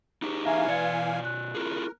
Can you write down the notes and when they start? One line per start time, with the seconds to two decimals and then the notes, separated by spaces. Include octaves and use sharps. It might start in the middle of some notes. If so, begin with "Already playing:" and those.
0.22 D#4 G4 G#4
0.46 E3 E5 F5 G#5 A#5
0.67 B2 D5 G#6 C#7
1.25 F#6
1.55 E4 F4 G#4 A#4